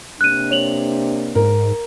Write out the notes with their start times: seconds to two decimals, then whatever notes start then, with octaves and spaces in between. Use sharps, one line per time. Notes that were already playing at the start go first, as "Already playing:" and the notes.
0.21 C3 A#3 D4 F#6 D#7
0.51 C#5 F7 F#7
1.35 G#2 A#4